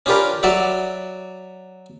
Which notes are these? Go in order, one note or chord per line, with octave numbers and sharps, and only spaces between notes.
C#4 D4 F4 G4 A#4 B4
F#3 F#4 D5 E5 F#5